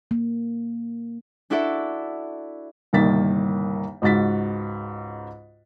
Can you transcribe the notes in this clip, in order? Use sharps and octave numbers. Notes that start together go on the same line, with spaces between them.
A#3
D4 E4 F#4 A4 D5 E5
G1 C2 D#3 A#3 A6 B6
C#2 G#2 F#4 A6 B6